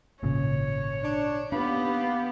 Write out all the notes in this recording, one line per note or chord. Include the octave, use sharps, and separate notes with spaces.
G#1 A#2 C#3 C#5
D4
D#2 B3 D4 G4 B4 F5